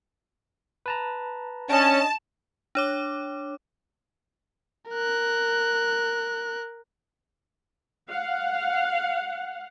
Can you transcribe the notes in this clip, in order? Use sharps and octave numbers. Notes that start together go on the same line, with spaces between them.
B4 A5 A#5
C#4 D4 D#5 A5
D4 C#5 D6
A#4 F#6
F5 F#5